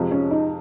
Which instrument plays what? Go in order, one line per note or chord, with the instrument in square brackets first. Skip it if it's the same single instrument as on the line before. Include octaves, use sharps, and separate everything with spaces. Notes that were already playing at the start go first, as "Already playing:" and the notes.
Already playing: [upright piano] F2 C3 F3 G#3
[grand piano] C#4
D#4